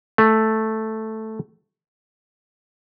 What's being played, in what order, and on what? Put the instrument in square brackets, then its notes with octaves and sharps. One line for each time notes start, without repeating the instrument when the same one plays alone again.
[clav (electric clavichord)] A3